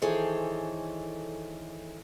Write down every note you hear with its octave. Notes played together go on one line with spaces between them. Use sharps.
D#3 E3 G#4 A4 C5 C#5